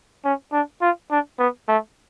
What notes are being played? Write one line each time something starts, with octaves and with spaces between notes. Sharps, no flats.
C#4
D4
F4
D4
B3
A3